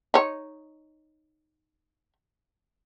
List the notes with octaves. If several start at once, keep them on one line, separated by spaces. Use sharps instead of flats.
D#4 C#5